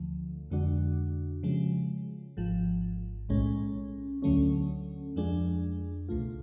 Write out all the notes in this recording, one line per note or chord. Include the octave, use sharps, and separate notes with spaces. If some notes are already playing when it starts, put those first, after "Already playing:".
Already playing: D2 D3 F3 A3
F2 D3 G#3 D4 F#4
C#3 F3 G#3
G#1 G#2 F3
B1 A2 G#3 C#4
D2 D3 F#3 A3 C#4
F2 F3 G#3 D4 G#4
C#2 B2 A3 F4